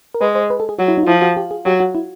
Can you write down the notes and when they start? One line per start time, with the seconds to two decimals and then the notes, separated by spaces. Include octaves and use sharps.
0.15 A#4
0.21 G#3 B4
0.35 C5
0.50 B4
0.60 A4
0.69 G#4
0.79 F#3 F#4
0.88 E4
0.98 D#4
1.03 F4
1.07 F3 E4
1.22 F#4
1.37 G4
1.51 G#4
1.66 F#3 G4
1.80 F#4
1.95 E4